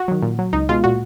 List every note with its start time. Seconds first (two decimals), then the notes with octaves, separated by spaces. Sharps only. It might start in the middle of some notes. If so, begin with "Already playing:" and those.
Already playing: F#4
0.08 D#3 F#3
0.22 A#2
0.39 F#3
0.53 C#2 D#4
0.69 B2 G#3 F4
0.84 A#2 F#4